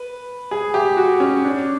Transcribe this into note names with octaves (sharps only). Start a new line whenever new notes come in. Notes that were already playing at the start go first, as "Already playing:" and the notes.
Already playing: B4
G#4
G4
F#4
C#4
D4